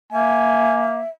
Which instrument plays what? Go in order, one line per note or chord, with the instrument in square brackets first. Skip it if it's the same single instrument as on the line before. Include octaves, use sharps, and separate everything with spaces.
[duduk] A#3 [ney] E5 [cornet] G#5